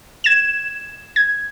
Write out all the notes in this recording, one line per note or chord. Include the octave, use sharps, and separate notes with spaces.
G#6 E7
G#6